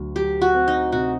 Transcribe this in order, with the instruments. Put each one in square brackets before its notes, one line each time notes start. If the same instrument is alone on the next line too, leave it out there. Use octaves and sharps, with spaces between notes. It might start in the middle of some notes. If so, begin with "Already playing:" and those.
Already playing: [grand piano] D2 F#3
[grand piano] F#3 [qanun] G4
[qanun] F#4
[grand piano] C4
[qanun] D#4
[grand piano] C3 [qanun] F#4